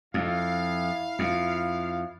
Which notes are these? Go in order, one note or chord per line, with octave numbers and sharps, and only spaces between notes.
F2 E4 F5
F2